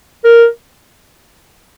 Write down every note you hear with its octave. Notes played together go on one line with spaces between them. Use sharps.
A#4